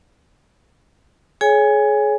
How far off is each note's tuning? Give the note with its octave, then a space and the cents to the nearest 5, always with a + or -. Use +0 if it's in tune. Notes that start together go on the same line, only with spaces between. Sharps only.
G#4 +30 C#5 +0 G#5 -15